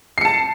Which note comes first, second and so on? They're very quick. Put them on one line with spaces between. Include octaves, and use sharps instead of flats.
C7 C#7 A5